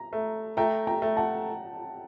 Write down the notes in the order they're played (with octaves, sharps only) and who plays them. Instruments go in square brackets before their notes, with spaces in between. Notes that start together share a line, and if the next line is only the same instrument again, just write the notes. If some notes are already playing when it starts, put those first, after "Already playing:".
Already playing: [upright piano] A#5
[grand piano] A3
[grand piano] A3 [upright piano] G5 A#5
[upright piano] G5 A#5
[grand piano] A3
[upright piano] F#5 A5